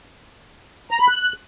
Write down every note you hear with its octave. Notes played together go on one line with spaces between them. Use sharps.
A#5
B5
F#6